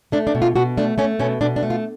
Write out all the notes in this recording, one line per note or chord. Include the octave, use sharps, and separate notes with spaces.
A3 D4
D4
B2
F4
B2 F#4
A3 D4
A3 C#4
B2 C#4
B2 D4
D4
A3
F4